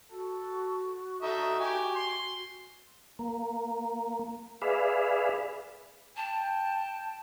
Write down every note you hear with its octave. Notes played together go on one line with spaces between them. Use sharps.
F#4 A4
D#4 A4 E5 D#6
G4 G#5
C6
A#3
G#4 B4 D5 E5 F5
G5 A5